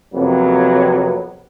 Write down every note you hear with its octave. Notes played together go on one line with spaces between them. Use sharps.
F2 C3 F#3 A#3 B3